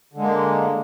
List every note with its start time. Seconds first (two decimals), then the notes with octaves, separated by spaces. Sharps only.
0.13 D3
0.18 G#3
0.22 A#3